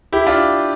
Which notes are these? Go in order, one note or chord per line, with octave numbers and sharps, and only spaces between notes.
E4 G4
D4 F4